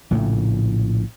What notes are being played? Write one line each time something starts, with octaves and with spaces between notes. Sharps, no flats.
A#1 A2 C#3 A3